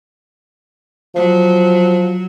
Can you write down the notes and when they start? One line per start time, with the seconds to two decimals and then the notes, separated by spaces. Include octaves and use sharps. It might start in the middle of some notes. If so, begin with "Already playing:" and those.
1.15 F3 F#3